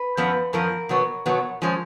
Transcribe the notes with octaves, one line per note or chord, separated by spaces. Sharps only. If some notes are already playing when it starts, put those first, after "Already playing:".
Already playing: B4
F#2 F3 B3
F#2 F3 B3 A#4
B2 F#3 B3
B2 F#3 B3
F3 G#3 C#4